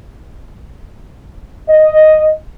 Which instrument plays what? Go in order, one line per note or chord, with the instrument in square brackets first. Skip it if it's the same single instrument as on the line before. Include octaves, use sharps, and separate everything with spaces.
[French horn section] D#5